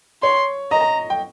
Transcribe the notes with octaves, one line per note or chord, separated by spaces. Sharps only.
C#5 C6
D#5 A#5
G5